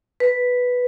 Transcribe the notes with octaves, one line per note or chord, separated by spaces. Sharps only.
B4